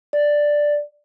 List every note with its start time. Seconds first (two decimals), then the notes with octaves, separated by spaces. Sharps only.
0.13 D5